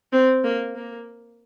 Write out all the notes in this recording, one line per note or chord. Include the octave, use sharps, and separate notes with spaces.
C4
A#3
A#3